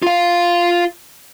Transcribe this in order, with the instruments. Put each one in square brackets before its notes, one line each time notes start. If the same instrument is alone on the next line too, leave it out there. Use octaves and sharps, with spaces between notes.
[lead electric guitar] F4 F5